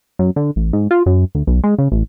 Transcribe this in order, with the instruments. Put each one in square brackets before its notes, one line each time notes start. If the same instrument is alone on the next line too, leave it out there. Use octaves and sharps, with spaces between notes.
[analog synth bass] F#2
D3
A1
G#2
F4
F#2
D2
B1
G#3
C#3
A1